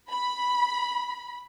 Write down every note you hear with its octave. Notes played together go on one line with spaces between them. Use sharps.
B5